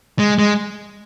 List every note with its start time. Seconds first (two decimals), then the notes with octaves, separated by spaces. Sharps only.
0.19 G#3
0.39 G#3